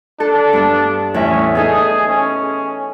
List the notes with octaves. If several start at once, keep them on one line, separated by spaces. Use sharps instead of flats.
D4 A4
G2 B3
E2 A2 C#4 E5
B3 D#4 G#4 A4
C#4